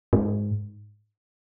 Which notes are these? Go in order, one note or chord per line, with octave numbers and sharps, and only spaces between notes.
G#2